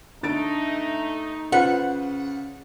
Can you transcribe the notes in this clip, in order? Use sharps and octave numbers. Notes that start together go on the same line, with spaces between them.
D3 A3 D#4 A6 D7
C#3 F4 B4 C5 F#5